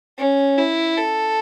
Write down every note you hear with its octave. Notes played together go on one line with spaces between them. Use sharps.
C#4
E4
A4